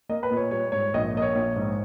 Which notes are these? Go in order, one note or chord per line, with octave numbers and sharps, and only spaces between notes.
A#3 D#5
B4
A#2
C#5
G3 C#5
G#2 C#5
A#1 D#5
A#3 D#5
C#5
A#1 C#5
G#2